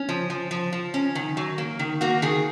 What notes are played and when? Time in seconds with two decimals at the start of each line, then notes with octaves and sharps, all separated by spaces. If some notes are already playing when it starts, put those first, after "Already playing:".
Already playing: C#4
0.09 F3
0.30 F3
0.51 F3
0.73 F3
0.94 C#4
1.15 D#3
1.37 F#3
1.58 A#3
1.79 D#3
2.01 A#3 F#4
2.22 D#3 G#4